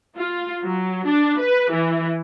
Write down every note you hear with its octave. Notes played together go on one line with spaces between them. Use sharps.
F4
F#3
D4
B4
E3